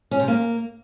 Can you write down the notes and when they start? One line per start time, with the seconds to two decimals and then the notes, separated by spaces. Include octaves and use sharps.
0.11 C#4
0.20 C3
0.28 A#3